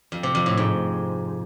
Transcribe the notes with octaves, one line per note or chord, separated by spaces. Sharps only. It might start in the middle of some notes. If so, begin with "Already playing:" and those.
F2
C3
F2
A2
G#2